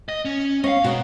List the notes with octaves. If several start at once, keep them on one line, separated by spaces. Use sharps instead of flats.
D#5
C#4
C#4 D#5 F5
B2 F#4 A#4 D#5